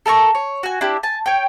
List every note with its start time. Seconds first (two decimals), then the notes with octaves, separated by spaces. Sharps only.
0.06 A4 A#4 A5 C#6
0.35 C#5
0.63 F#4 G#5
0.81 D4 E4 G4
1.03 G#5 A5
1.26 C#5 G5